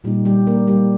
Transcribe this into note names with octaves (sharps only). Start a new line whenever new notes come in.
A#2 G3 A#3 D#4 G4
G3 G4
A#3 A#4
G3 G4